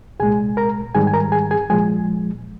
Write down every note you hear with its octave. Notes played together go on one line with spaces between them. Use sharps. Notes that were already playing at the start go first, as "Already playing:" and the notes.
C2 A#2 G#3 G#4 G#5
A#4 A#5
G#2 D#3 G3 G#4 G#5
G#5
A#4 A#5
G#4 G#5
G#4 G#5
A#2 F3 G#3 G#4 G#5